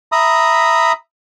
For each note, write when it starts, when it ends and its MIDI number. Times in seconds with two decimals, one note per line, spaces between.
0.12 0.92 76
0.12 0.92 82
0.12 0.92 83
0.12 0.92 87